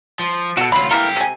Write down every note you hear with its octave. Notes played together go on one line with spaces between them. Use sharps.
F3
B2 F#4 A4
D2 F#3 F4 B5
E3 A#3 G4 A4 A#4
C3 G#5